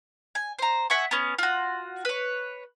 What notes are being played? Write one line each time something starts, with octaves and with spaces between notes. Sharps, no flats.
G#5
C5 A#5
E5 F#5 G#5 C#6
B3 C#4
F4 F#4
B4 C#5